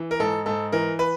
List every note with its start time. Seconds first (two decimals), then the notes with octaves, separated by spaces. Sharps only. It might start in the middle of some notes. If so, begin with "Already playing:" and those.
Already playing: E3
0.11 A#4
0.20 G#2 A4
0.46 G#2 A4
0.72 E3 A#4
0.99 B4